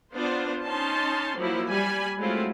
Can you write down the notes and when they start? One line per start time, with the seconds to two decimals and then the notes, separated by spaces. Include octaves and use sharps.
0.14 B3 D4 F4 C5
0.64 C#4 D#4 A5 C6
1.37 F3 F#3 A#3 E4
1.69 G3 G#5 B5
2.19 F#3 G#3 A3 C4 E4 F4